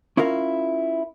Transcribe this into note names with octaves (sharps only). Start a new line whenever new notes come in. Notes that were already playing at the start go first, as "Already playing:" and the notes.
C#4 E4 F4 A#4 F5